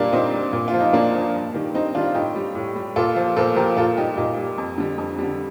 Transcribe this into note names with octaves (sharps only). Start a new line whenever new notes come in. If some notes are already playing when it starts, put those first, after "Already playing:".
Already playing: A#2 G3 A#3 D4
A#2 C4 D#4
G3
A#2
F4
F3
D#4
A#2 A#3 D4
F3
G2
D#3 G3
G2 C4 D#4
D#3 G3 D4 F4
A2 D#4 G4
G3
A2
G3
A#2 F4 A4
F3
A#2 A4 C5
F3 G4 A#4
A#2 F4 A4
G3 D#4 G4
A#2 D#4 G4
G3
F2
D3 G3
F2
D3 G3